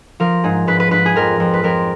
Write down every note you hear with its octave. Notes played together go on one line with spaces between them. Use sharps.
F3 A#4
G#2 G#4
G#2 B4
B4
G#2 B4
G#4
F2 A#4
F2
B4
F2 A#4